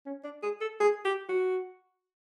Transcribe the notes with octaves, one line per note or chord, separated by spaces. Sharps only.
C#4
D4
G#4
A4
G#4
G4
F#4